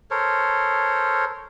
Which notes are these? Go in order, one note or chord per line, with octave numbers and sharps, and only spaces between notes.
A4 A#4 C5 C#5